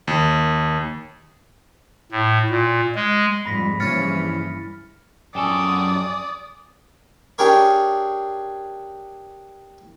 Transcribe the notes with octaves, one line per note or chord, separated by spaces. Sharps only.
D#2
A2
A#2
G#3
F2 G#2 G3 B5 A#6 B6
A#1 G2 C#3 E3 C#4 F6 A6 C#7
F#2 A4 D5 G5 G#5 C#6 D#6
D4 G4 G#4 A#4 C#5